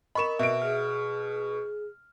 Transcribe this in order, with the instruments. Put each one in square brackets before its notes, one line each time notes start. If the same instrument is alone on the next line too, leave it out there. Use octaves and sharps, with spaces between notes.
[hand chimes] A#4 D#5 [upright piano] B5 C#6 E7
[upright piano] B2 D7 [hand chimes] E5
[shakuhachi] G#4 [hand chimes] F6